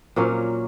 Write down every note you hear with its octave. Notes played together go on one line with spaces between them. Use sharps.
A#2 F#3 A#3 C#4